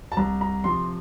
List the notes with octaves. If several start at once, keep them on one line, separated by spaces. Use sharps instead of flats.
A5
C2 A#5
A#5
C3 F3 C6